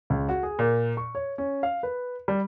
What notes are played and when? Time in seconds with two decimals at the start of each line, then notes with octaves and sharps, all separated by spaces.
0.10 C#2
0.29 F#4
0.43 G#4
0.59 A#2
0.97 C#6
1.15 C#5
1.38 C#4
1.63 F5
1.83 B4
2.28 G3